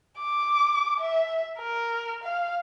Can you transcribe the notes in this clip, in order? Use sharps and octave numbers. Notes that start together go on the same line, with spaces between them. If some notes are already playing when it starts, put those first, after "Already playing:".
D6
E5
A#4
F5